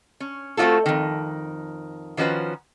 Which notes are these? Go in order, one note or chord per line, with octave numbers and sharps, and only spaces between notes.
C#4
A3 C4 D#4 F4 F#4 A4
F2 D#3
D#3 F3 C#4 F#4 B4